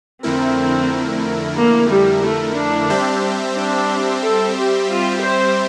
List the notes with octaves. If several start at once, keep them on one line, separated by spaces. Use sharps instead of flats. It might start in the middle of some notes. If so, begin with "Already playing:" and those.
F2 D3 A3 C4 E4 A#4
A#3
G3
A3
D4
G3 C4 G4 C5 E5
D4
A4
G4
F4
C5